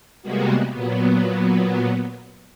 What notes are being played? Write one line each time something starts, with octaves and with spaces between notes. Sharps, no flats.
C3 G3 G#3 A#3 B3 F#4
A#2 F#3 B3